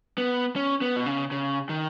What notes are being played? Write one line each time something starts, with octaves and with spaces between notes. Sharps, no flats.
B3
C#4
B3
B2
C#3
C#3
D#3